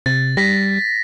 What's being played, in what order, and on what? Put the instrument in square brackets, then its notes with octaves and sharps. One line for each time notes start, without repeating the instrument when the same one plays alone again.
[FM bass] C3 [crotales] A6
[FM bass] G3 [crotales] A#6 B6